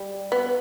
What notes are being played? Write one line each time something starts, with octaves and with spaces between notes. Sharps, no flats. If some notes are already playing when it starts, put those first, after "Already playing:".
Already playing: G3
B3